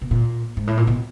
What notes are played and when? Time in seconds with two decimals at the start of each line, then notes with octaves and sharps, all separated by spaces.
0.02 B2
0.11 A#2
0.57 G#2
0.67 A2
0.77 A#2
0.87 B2